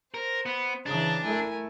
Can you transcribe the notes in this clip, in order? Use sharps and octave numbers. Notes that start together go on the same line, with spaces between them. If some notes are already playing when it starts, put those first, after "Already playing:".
A#4 C5
B3
C#3 E3 D4 A5 A#5
A3 E4 A#4 G#5